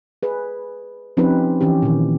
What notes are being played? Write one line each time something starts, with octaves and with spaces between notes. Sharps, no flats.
G#4 B4
F3 C4 C#4 D#4 G4 B4
E3 C#4 G4
A#2 D#3